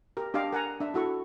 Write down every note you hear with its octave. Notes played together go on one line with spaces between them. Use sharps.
G4 A#4
D4 G4 D#5 F5 D6
A#4 F#5 G#5 A#5
D4 E5
E4 F#4 A4 C#6